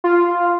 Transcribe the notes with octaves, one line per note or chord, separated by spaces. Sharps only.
F4